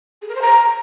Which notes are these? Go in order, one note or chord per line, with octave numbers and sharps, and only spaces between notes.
G#4
A#4
C5
A#5